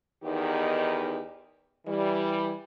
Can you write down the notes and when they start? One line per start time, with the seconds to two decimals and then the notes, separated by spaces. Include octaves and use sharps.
0.23 E2 D#3 B3 D#4 G4
1.87 E3 G3